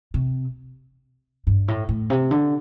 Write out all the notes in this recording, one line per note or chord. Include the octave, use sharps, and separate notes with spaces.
C3
G2
A2
A2
C3
D3